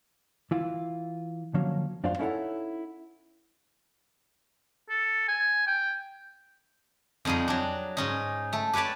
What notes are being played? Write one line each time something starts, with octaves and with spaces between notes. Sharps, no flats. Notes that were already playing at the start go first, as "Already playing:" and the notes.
E3 E4 F4
D3 F3 F#3 A#3 C#4
F#2 D4 F4 C5 F5 C6
C#4 D#4 E4 A4 C#5 F#5
A4
G#5
G5
F2 G3 D#4 F4 G#4
F#3 D4
G#2 C#4 D#4
A3 A4
G4 B4 C#5 D5 A5